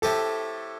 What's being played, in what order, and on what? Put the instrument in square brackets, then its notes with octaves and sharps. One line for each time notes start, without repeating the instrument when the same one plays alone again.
[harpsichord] A2 A3 C4 G4 [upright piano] A4